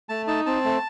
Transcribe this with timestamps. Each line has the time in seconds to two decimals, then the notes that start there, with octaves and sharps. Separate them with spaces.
0.09 A3 A5
0.27 D#4 A5
0.46 C4 A5
0.65 A3